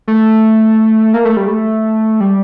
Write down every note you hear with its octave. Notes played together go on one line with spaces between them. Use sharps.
A3
A#3
A3
G3
A3
G3